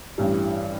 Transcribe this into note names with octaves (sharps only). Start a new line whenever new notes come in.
A1 G2 E3 G3